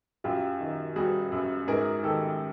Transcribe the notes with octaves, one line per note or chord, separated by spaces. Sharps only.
F#2 F4 G4
D#3
G3 F#4 G#4
F#2
G#2 G#4 A#4
D#3 G4 A4